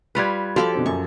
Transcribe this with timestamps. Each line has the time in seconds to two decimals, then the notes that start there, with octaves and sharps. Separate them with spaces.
0.15 G3 F4 B4 F#6 G#6
0.56 F3 F#4 G4 A4 D5 F5
0.74 B2 D3 C4
0.86 F#2 C#6